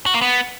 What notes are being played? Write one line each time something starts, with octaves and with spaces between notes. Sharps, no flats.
F#4
A#3
B3